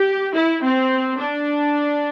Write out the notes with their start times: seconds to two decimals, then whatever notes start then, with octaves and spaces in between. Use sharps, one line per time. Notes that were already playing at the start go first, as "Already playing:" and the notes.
Already playing: G4
0.35 E4
0.62 C4
1.19 D4